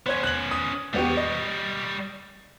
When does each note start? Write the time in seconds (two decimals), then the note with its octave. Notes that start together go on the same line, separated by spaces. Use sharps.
0.06 B3 C#4 C5 C#5 G#6
0.23 F#6 F#7
0.51 D#6
0.94 E1 G3 B3 G4 C#5
1.17 D#5